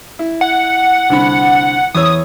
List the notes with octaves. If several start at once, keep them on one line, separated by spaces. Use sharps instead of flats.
E4
F#5
C2 D3 B5
E2 C#5 D#6 E6